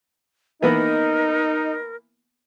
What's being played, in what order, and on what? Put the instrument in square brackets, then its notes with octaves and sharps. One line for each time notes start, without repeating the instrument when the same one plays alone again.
[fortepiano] E3 A#3 B3 [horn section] D#4 [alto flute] A#4